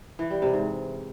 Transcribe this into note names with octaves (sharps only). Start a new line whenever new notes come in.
E3
G3
C3
G#2